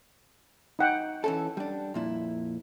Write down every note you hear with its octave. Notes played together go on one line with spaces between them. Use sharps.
D#4 F#5 G5
E3 C#4 A4
G3 D4
F2 A#2 E4